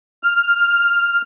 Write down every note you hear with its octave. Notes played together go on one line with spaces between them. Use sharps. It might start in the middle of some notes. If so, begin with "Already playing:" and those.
F6